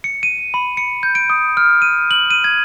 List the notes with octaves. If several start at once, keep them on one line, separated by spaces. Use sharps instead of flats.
C#7
D#7
B5
C#7
G6
D7
D#6
F6
D#7
F#7
D#7
G#6